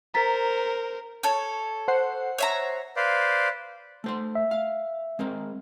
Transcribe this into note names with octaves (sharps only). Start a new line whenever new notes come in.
A#4 C5 A#5 A6 B6
A4 C#5
C5 F#5 C7
C#5 E5 A#5
B4 C5 D5 F5
A3 C5 C6
E5
F5
G#3 C4 A#4